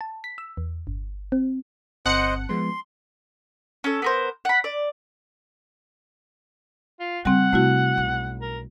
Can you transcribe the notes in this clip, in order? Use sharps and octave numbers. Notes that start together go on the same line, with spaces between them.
A5
B6
E6
E2
G1
C4
G1 C4 C5 D#5 F#5 A5 C#7
F3 G#3 B3 C6
C#4 A4
B3 A#4 C5
F#5 B5
D5
F4
C#3 G3 C4 F#5
C3 A3 E4 F#4
B1
A#4